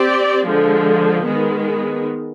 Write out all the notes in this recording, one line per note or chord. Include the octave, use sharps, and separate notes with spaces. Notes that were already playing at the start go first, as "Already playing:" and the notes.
Already playing: C4 G4 D5
D3 F3 G#3
D#3 G#3 B3